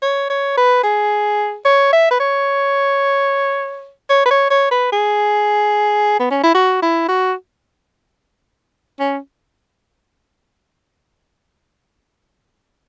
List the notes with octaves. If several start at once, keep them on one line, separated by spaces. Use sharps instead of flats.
C#5
C#5
B4
G#4
C#5
E5
B4
C#5
C#5
B4
C#5
C#5
B4
G#4
B3
C#4
E4
F#4
E4
F#4
C#4